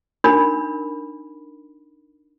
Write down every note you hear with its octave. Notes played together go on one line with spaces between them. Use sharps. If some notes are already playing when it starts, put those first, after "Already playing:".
D4 D#4 A#4 B5